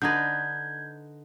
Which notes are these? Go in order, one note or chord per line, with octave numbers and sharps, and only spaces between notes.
D3 D#4 B4 G6 G#6